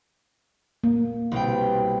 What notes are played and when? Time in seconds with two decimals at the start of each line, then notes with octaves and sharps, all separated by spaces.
0.84 A#3
1.31 C2 B2 G5